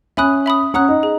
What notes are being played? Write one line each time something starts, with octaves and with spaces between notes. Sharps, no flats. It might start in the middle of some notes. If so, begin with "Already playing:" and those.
C#4 E5 G#5 B5 D#6 F#6
E5 B5 D#6
C#4 F#5 A#5 D#6 F#6
D#4
G#4